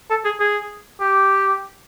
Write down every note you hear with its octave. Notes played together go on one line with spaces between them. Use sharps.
A4
G#4
G#4
G4